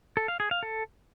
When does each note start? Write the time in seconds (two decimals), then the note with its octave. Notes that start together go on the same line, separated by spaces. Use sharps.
0.17 A4
0.28 F5
0.40 G#4
0.51 F5
0.63 A4